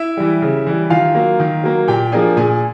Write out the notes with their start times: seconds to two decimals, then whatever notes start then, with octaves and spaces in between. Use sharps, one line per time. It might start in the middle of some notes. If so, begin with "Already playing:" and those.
Already playing: E4 E5
0.17 E3 G3
0.42 C#3
0.67 E3 G3
0.90 D#3 F4 F5
1.15 F#3 A#3
1.40 D#3
1.64 F#3 A#3
1.88 A#2 G4 G5
2.12 F3 A#3 D4 G#4 G#5
2.37 A#2 G#4 G#5